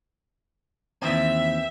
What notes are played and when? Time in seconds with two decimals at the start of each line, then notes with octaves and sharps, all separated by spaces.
1.02 D#2 E3 C4 E5